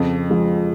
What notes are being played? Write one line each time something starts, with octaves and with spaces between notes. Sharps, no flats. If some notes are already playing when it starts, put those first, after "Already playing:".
Already playing: F2 C#3
F3 G#3